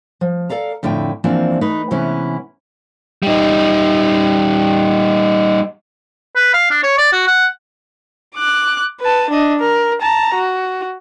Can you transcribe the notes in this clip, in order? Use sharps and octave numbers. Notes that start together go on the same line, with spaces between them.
F3
A4 D5 F5 A#5
F2 A2 D3 E4 G5
E3 F3 A#3 C4 D4
A3 D#4 B4
C3 E3 G#3 B3 C#4 E4
G3 D#4
B4
F5
D4
C#5
D5
F#4
F#5
D6 F#6
B4 A5
D4 D#5
A#4
A5 A#5
F#4